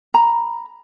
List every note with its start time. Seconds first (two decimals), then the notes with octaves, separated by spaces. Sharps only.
0.14 A#5 B5